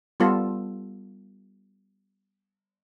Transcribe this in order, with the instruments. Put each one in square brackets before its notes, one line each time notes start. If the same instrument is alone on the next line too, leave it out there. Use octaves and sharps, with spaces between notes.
[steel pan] G3 B3 F4 A4